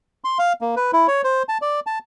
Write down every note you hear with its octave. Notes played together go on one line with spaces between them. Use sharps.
C6
F5
A#3
B4
E4
C#5
C5
A5
D5
A5